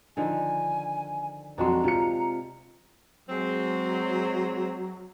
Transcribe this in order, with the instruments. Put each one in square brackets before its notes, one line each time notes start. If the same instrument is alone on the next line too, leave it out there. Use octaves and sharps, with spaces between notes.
[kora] D3 D#3 F3 [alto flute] G#5
[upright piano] F2 F#4 C6 [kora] F#3 G#3 D4 [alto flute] A#5
[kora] C3 [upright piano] F4 C#7
[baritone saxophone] F#3 [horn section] G#3 C4